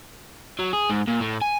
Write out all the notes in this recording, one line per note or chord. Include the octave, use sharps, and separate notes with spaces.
F#3
G#4
G#2
A#2
A2
G#5